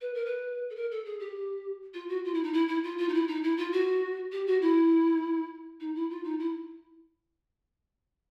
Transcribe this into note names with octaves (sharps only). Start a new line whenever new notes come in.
B4
A#4
B4
A4
A#4
A4
G#4
G4
F4
F#4
F4
E4
D#4
E4
E4
F4
F4
D#4
E4
D#4
E4
F4
F#4
G4
F#4
E4
D#4
E4
F4
D#4
E4